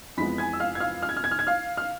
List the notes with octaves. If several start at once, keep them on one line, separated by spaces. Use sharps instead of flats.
F2 E3 G#3 B3 B5 B6
G#5 G#6
E6
F5 F6
G#6
F5 F6
F6
G#6
F6
G#6
F6
G#6
F5 F6
F6